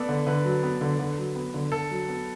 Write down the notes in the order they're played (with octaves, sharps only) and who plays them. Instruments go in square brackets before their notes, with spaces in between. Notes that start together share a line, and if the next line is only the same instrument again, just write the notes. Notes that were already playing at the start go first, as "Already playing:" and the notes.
Already playing: [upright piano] B3 [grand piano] A4 D5
[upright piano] D3
[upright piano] D3 [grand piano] B4
[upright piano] F#3
B3
D3
D3
F#3
B3
D3
[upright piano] D3 [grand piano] A4
[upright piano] F#3
B3